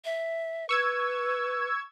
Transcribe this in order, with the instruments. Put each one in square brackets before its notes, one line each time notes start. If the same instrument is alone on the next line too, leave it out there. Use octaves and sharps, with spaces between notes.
[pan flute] E5
[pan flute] B4 [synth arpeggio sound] C#6 E6 G#6